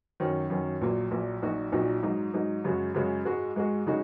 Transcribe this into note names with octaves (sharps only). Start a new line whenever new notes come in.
F#2 D#3 F#3 C#4
F#2 D#3 F#3 C#4
A#1 A#2 F#3
A#1 A#2 F#3
A#1 A#2 F#3 D#4 F#4
A#1 A#2 F#3 D#4 F#4
G#2 F#3 D#4
G#2 F#3 D#4
F#2 C#3 G#3 F#4
F#2 C#3 G#3 F#4
G#2 G#3 F#4
G#2 G#3 F#4
C#3 G#3 D#4 F#4